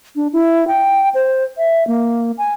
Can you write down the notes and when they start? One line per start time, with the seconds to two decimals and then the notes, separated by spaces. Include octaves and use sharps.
0.16 D4
0.33 E4
0.68 G5
1.15 C5
1.58 E5
1.87 A#3
2.38 G#5